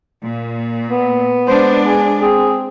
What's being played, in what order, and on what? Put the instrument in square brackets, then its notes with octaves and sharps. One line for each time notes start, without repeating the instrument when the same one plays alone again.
[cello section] A#2
[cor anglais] B3
[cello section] G#3 D4 [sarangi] C5
[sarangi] G#4
[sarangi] C4 [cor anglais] G#4